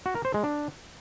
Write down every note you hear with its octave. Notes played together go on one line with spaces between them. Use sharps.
F#4
A#4
C5
G#3
D4